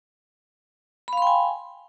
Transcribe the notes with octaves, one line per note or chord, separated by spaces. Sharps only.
F5 G5 G#5 B5 C6